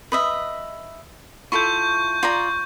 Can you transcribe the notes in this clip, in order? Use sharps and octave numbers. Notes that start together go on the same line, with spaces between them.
B4 D#5 E5
E4 F4 A4 C#6 G6
F4 D5 A#5